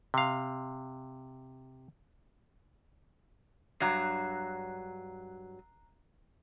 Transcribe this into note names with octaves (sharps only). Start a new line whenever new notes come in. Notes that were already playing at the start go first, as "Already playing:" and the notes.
C3 F5
G2 F#3 A#5 F#6 C7